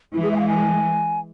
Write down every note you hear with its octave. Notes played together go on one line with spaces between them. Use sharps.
E3 G#3 E4
G#4
E5
G#5
F5
G#5